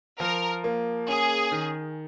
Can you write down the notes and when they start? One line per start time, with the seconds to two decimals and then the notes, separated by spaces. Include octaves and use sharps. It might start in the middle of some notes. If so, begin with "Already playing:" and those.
0.20 F3 A#4
0.64 A#3
1.08 C#4 G#4
1.52 D#3